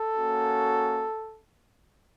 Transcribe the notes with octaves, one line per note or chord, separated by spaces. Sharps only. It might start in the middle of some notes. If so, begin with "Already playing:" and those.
Already playing: A4
A#3 C#4 F#4